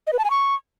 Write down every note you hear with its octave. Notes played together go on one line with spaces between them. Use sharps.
D#5
B4
A5
G#5
C#6